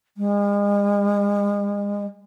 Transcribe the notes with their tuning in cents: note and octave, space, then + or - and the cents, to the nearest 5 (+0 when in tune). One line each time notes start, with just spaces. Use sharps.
G#3 -40